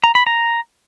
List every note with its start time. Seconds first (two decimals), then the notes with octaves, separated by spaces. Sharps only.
0.04 A#5
0.15 B5
0.27 A#5